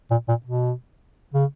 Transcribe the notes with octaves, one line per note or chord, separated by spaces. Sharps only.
A#2
A#2
B2
C#3